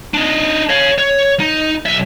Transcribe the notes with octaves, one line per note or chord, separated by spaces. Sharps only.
D4 D#4
C#5 F5
C#5
D#4
B1 E5